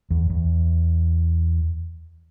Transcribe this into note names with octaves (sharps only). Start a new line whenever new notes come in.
E2
E2